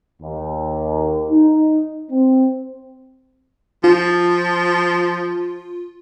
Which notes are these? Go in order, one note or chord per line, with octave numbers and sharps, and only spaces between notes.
D#2
D#4
C4
F3 F4